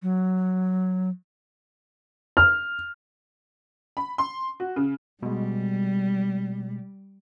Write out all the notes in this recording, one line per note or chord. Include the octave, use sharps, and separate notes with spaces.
F#3
F6
B5
C6
F#4
C#3
B2 G3 G#3